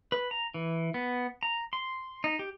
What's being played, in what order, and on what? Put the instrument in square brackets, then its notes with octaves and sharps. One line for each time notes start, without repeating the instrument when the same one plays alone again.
[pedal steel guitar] B4
A#5
E3
B3
A#5
C6
D#4
G4